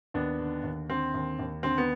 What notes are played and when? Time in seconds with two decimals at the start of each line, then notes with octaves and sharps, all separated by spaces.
0.14 D#2 B3 D4
0.39 D3
0.64 D#2
0.89 D3 C4
1.14 D#2
1.39 D#2
1.63 D3 C4
1.78 B3